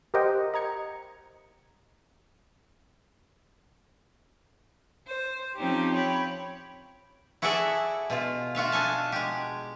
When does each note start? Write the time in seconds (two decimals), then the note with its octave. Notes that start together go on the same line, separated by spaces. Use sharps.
0.14 G4 A#4 C5 D#5 F#5 G5
0.54 D#5 A#5 G#6 C#7
5.07 C5
5.56 F3 C4 C#4 D#4 G4
5.94 C#5 G5 B5
7.42 E4 F#4 G#4 A4 D5 E5
8.10 B2 F4
8.55 F4 F#4 E5 F5
8.72 D4 A4 G#5 A5
9.12 G#3 G4